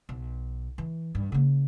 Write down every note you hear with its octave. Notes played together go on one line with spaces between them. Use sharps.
B1
E3
G2
C#3 A#3